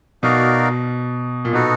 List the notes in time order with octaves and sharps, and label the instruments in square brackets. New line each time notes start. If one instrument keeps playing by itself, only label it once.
[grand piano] B2 [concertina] D#4 F#4 A#4 D5 F5
[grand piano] A#2
[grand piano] B2 [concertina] B3 D#4 F#4 A4